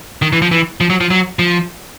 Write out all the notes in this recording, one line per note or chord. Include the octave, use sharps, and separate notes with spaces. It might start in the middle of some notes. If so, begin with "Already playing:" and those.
D#3
E3
F3
E3
F3
F#3
F3
F#3
F3